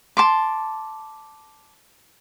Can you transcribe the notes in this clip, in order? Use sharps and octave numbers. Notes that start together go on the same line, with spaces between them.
A5 C6 D6